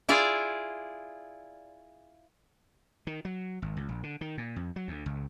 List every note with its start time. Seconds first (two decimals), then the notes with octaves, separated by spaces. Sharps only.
0.09 E4 F4 G#4 D5
3.07 D#3
3.25 F#3
3.62 G#1
3.77 C#2
3.89 A#1
4.03 D3
4.21 D#3
4.38 A#2
4.56 F2
4.76 F#3
4.88 D2
5.06 C#2